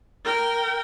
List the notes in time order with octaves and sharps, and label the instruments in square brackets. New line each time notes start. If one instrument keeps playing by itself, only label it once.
[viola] A#4 G5